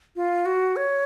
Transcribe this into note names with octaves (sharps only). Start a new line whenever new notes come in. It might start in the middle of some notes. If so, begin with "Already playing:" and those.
F4
F#4
C#5